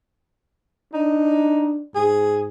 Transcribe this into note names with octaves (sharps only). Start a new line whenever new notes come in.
D4 D#4
G#2 G#4